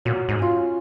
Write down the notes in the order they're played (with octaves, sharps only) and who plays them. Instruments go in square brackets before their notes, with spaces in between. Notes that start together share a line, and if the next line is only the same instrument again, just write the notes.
[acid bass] A#2 [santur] F#3
[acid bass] G#2
[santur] C#4 F4